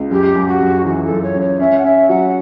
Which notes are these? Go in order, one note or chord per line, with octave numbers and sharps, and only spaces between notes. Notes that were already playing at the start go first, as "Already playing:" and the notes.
Already playing: C#2
F#2 G4
F#2
F#4
F#2
E3 F#4
A4
F#2
C#5
F#2
C#5
C#4 E5
F#5
C#4 E5
F#3 F#5